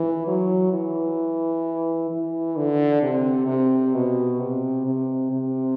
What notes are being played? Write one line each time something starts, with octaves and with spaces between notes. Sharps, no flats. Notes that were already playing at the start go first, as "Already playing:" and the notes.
Already playing: E3
F#3
E3
E3
D3
C3
C3
B2
C3
C3
C3